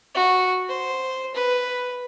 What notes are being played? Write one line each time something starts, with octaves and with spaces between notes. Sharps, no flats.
F#4
C5
B4